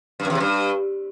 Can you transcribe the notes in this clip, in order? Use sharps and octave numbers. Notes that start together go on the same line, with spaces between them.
G2
F#2
E2
C3
G2